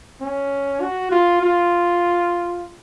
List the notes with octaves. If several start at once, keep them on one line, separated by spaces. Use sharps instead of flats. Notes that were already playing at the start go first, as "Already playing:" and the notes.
C#4
F#4
F4
F4